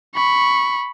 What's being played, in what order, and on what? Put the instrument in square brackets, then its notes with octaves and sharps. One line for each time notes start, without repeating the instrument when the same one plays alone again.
[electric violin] B5 C#6